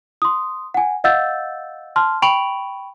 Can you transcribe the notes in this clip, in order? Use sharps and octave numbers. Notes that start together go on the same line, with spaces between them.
C6 D#6
F#5 G#5
D#5 F5 F#5 E6 G6 A6
A5 C6 F6
G5 B5 C#6 D7 F7 F#7